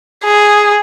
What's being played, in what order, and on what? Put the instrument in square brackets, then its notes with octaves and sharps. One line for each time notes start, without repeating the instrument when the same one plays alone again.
[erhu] G#4